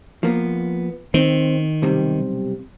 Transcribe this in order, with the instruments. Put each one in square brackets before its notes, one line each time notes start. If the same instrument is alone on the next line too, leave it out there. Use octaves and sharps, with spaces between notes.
[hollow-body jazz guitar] F3 A#3 B3
[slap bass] D#3 [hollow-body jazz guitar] C4
[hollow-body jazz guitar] B1 C3 G3